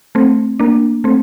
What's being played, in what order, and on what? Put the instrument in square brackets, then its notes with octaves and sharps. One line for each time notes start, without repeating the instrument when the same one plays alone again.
[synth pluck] A3 C4
A#3 D4
A3 C4